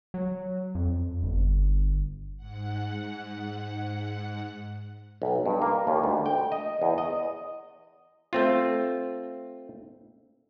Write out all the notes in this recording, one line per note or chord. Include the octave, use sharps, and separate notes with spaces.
F#3
F2
G1
G#2 F#5
B1
G2
A#3
D#2
D2
G5
D#5
E2
D#5
A3 C4 F4